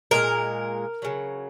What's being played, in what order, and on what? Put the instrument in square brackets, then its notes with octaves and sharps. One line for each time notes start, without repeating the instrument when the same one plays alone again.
[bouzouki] A#2 G#3 A#4
C#3 F#3